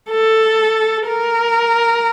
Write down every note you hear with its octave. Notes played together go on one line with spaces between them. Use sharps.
A4
A#4